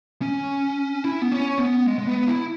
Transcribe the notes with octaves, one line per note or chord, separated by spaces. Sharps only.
C#4
E4
B3
C#4
B3
G#3
G#3
B3
E4